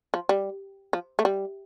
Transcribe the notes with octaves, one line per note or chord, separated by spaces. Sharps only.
F3
G3
F3
A3
G3